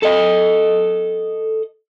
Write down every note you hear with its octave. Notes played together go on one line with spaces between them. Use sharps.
A4 D#5